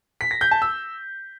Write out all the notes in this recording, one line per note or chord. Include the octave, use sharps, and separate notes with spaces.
B6
A#6
G6
A5
E6